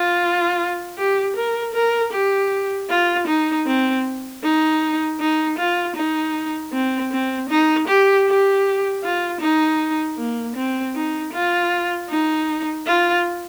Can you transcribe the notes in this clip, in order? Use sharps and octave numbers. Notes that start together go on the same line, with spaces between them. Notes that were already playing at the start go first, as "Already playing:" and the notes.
Already playing: F4
G4
A#4
A#4
G4
F4
D#4
C4
D#4
D#4
F4
D#4
C4
C4
D#4
G4
G4
F4
D#4
A#3
C4
D#4
F4
D#4
F4